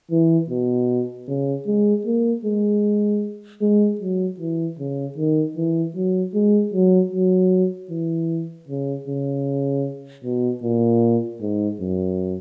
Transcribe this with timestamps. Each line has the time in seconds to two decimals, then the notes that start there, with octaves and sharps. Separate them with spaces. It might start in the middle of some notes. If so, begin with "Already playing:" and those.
0.11 E3
0.50 B2
1.28 C#3
1.67 G#3
2.06 A#3
2.45 G#3
3.62 G#3
4.01 F#3
4.40 E3
4.79 C#3
5.18 D#3
5.57 E3
5.96 F#3
6.35 G#3
6.74 F#3
7.13 F#3
7.91 E3
8.68 C#3
9.08 C#3
10.24 B2
10.63 A#2
11.41 G#2
11.81 F#2